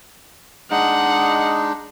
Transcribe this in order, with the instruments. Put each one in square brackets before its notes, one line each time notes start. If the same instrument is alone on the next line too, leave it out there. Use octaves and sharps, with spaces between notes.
[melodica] G#3 D4 D#4 [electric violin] F#5